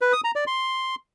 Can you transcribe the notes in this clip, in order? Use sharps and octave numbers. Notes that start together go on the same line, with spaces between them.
B4
D#6
A#5
D5
C6